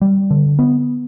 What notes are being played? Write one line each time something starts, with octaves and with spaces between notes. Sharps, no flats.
G3
D3
B3